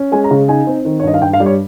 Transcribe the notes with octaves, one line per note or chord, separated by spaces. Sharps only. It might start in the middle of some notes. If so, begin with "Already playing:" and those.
Already playing: C#4
G#3 G#5
A#5
C#3
D#4 G#5
C4
D#3
C#5
G2 D#5
F5
G2 G5
F5
G3
C#5